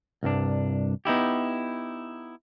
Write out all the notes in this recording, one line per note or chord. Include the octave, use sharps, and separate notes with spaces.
C2 G2 D4
B3 D#4 E4 G4